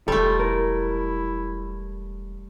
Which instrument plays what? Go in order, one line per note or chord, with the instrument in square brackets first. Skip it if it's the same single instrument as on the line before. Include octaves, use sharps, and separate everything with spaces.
[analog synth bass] E1 [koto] G3 A3 [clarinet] F4 [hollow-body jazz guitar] A4
[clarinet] E4 [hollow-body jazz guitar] A#4